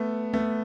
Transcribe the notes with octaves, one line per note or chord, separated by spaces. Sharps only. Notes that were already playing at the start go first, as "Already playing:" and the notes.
Already playing: A3 B3
A3 B3